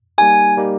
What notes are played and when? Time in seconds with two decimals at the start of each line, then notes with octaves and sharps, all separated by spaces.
0.18 G3 A#3 D#4 G4 G#5
0.57 G3 A#3 D#4 G4